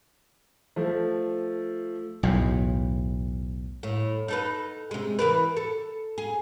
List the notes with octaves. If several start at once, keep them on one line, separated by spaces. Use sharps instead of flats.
F3 A3
B1 E2 A2
A2
D#4 A4 B4
C3 G#3
E3 A#4 B4
A4
G#4